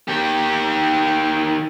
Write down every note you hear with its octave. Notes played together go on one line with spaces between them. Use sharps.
D#3 G4